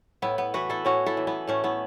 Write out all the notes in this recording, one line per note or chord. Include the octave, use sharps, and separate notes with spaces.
A2 B3 E4
B3
E3 F#4 B4
E4 A4
A2 C#4 F#4
E4 A4
E3
B3 E4
A2 A3 C#4
B3 E4